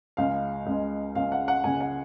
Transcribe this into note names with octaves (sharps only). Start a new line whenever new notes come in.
C#2 C#3 G#3 F5
C#2 C#3 G#3
C#2 C#3 G#3 F5
F#5
F#5
C#2 C#3 G#3 G#5
F#5